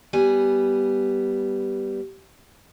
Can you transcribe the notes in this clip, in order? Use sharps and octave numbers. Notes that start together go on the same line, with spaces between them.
G3 B3 G#5